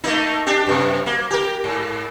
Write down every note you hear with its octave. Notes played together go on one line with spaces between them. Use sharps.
A3 A#3 D#4
D4 G4
F#2 C3
A#3
G4 A#4
G#2